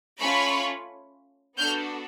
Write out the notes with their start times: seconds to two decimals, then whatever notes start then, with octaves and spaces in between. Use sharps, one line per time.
0.20 A3 C#4 F4 B5 C#6
1.57 B3 D4 F#4 A4 F6 G6